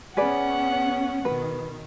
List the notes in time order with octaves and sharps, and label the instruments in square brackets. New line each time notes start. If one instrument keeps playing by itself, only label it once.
[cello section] B3 C#4 [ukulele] G#4 B4 D5 [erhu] F#5
[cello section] B2 D#3 [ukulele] B4